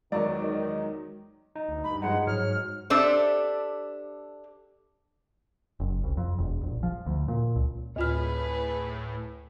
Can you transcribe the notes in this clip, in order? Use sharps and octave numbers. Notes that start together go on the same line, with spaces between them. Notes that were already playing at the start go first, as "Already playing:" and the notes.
E2 D#3 F#3 G#3 D5 A#5
D#4
D2
G2 B5
F3 G#3 D#4 F#5
G#2 F#3 G#4 C#5 F6
D4 G4 A4 C5 E5
F#1
C2
F2
E1
A#1
F3
D2
A#2
C#2
D2 A2 F4 G#4 A4 B4 F6